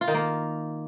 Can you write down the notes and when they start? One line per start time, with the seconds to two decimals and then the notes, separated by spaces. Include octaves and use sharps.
0.01 F4
0.08 D#3
0.14 A#3